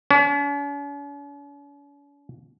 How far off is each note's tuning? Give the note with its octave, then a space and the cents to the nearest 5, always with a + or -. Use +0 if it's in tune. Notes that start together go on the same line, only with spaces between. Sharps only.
C#4 +45